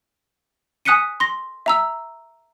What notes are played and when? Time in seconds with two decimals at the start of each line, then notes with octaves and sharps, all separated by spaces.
0.85 G#5 D#6 F#6 B6 C#7 D#7
1.20 C6 A#6
1.66 E5 A#5 E6